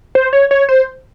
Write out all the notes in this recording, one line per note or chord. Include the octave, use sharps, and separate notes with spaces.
C5
C#5
C#5
C5